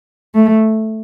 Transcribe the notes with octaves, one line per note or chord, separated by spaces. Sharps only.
A3